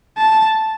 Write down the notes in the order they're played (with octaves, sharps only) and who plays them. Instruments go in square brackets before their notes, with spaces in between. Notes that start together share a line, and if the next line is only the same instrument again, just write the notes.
[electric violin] A5